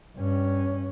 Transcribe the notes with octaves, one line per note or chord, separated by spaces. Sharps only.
G2 C#4